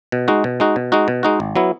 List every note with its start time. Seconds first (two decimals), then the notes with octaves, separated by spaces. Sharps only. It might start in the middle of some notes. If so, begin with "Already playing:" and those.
0.12 B2
0.28 G#3 D#4 F#4
0.44 B2
0.60 G#3 D#4 F#4
0.76 B2
0.92 G#3 D#4 F#4
1.08 B2
1.23 G#3 D#4 F#4
1.40 G#1
1.56 F#3 B3 E4